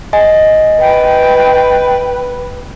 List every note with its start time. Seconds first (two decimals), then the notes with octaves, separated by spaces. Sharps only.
0.13 D#5 G#5
0.81 B4 G5